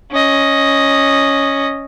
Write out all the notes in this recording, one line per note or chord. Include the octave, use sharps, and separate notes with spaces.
C#4 D#5